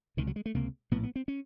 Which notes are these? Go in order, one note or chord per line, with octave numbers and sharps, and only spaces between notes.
C#2 C3 D#3
F#3
G#3
A3
C#2 C3 A#3
A#1 A2 B3
B3
C4
C#4